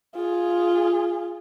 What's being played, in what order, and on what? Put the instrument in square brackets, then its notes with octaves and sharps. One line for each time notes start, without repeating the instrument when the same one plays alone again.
[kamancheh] F4 G#4